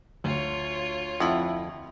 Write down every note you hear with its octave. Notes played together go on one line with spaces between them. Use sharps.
D2 F4 C#5
F2 E4 F#5